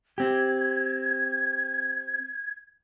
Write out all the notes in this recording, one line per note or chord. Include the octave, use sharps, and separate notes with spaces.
C4 G4 G#6